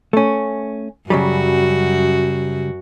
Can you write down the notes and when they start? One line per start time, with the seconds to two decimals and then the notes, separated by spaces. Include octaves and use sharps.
0.13 A3 C#4
1.10 F#2 C#3 F#3 G3 F#4